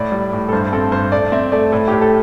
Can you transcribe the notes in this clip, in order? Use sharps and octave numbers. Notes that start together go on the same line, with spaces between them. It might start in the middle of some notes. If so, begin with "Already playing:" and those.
Already playing: A2 D5
G3
A2
A4
G2 C5
C4 A4
G2 C5
A3 D5
C4 E5
A3 D5
A2 A4
A2 G4
A4